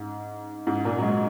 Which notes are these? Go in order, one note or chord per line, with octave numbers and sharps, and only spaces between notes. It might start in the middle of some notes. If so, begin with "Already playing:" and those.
Already playing: G#2
G#2
A#2
F#3
G#3